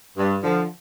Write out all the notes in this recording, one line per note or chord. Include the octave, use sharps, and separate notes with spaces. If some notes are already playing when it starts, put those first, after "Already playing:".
G2
D3 F3